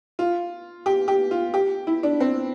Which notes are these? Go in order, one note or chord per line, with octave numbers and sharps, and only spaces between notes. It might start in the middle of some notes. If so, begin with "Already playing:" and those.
F4
G4
G4
F4
G4
E4
D4
C4